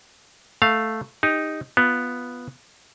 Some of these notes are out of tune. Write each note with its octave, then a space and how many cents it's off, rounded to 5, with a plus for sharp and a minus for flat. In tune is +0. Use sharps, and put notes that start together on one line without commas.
A3 +0 F5 +0
D#4 +0 G4 +35
B3 +0 F4 +0